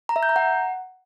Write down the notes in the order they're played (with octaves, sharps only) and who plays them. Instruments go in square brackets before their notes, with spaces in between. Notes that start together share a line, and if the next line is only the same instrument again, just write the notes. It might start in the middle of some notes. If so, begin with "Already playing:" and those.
[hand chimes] A#5
E5
G6
A#5
F#5